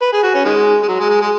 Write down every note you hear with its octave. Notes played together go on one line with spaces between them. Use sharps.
B4
G#4
F#4
C#4
D#3 G#3
G#3
F#3
G#3
G#3
G#3